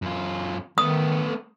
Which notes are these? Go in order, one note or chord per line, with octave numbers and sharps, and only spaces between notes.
F#2 F4
D#3 A3 B3 D#6